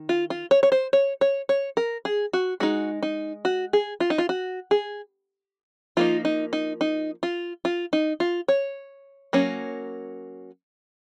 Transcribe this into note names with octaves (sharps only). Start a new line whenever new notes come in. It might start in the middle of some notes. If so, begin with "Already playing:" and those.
Already playing: D#3
F4
F4
C#5
C#5
C5
C#5
C#5
C#5
A#4
G#4
F#4
G#3 D#4 F#4
D#4
F#4
G#4
F4
D#4
F4
F#4
G#4
F3 A#3 D#4 F4
D#4
D#4
D#4
F4
F4
D#4
F4
C#5
F#3 A#3 C#4